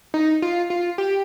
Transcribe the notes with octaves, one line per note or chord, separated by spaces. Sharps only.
D#4
F4
F4
G4